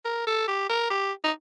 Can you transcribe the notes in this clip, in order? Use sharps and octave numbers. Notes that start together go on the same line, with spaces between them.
A#4
A4
G4
A#4
G4
D#4